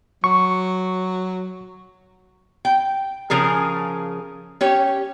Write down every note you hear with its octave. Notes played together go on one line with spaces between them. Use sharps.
F#3 C#6
G5
C#3 F3 G#4 A#4
C#4 G4 C#5